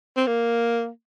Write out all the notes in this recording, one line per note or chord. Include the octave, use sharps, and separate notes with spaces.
C4
A#3